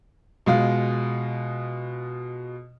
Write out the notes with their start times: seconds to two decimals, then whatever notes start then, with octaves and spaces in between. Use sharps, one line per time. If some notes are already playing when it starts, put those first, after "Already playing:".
0.46 B2 G#3 F4